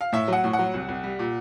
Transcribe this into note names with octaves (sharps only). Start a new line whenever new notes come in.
F5
A2 E5
F#3 F#5
A2
F#5
F#3
C2
C2
G3
A#2